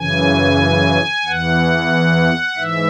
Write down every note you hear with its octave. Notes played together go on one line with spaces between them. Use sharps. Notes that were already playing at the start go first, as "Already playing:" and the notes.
Already playing: F#2 C#3 E3 G#5
E2 E3 F#5
G#2 E3 E5